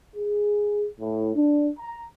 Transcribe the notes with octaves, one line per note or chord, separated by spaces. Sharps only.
G#4
A2
D4
A#5